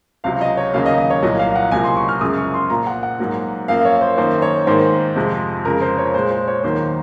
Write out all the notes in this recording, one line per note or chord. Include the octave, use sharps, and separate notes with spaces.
C#2 C3 F#3 F5
D#5
C#5
D#2 C#3 F#3 A#3 F5
D#5
D#5
C#5
C2 A#2 F#3 A#3 D#5
F5
F#5
C#2 C3 F#3 A#3 G#5
C6
C#6
F6
F#2 C#3 F3 G#3 D#6
C#6
C6
A#2 F3 A#3 A#5
F#5
F#5
G#2 F#3 A#3
F#2 F3 A#3 F5
C#5
C5
F#2 D#3 A#3 C5
C#5
G#2 D#3 A#3 C5
F2 C3 F3 G#3
F2 C#3 G#3 A#4
C5
C#5
A#2 G#3 C5
C5
C#5
D#2 D#3 F#3 A#3 C5